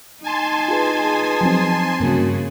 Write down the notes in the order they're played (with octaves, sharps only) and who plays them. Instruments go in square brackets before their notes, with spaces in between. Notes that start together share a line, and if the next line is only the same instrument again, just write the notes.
[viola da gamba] D#4 [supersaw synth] G#5 A5 C6
[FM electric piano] F4 G#4 B4
F3 F#3 C4
[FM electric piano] G2 A#3 [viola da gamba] C#3 F#4